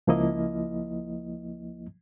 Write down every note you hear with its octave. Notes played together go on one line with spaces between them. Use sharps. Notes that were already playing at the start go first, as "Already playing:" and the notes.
C#2 F3 A#3 E4 D#5